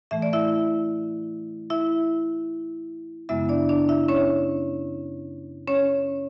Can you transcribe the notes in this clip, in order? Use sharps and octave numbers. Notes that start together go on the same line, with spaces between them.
A2 E3 A3 E5
D5
E4 E5
E4 E5
F#2 C#3 G#3 B3 E4 E5
D4 D5
D4 D5
E4 E5
C#4 C#5
C#4 C#5